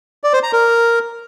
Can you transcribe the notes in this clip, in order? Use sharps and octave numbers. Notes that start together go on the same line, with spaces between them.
D5
C5
A#5
A#4